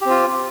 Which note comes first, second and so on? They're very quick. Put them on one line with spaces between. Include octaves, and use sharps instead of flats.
G4 C4 F4